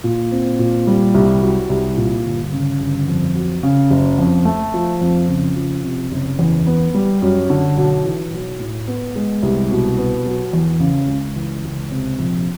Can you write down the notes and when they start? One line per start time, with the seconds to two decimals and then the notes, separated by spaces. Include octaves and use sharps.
0.04 A#2
0.31 C4
0.59 A#2
0.87 G3
1.14 C2
1.42 F#3
1.70 C2
1.97 A#2
2.25 G1
2.53 C#3
2.80 G1
3.07 F2
3.35 F#3
3.63 C#3
3.90 F#1
4.18 F2
4.45 A3
4.74 F3
5.01 F2
5.28 C#3
5.56 F3
5.84 C3
6.12 F#1
6.39 E2
6.67 B3
6.94 G3
7.22 F#2
7.50 D3
7.77 B1
8.05 E3
8.33 B1
8.60 A2
8.88 B3
9.16 G#3
9.43 C2
9.71 B2
9.98 B3
10.26 F#3
10.53 E2
10.80 C#3
11.08 C#2
11.36 E3
11.64 C#2
11.91 C3
12.19 A#1